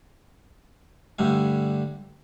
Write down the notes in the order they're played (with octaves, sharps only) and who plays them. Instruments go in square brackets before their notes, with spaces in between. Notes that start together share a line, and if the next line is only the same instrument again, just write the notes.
[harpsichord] G2 D3 G3 A3 G#5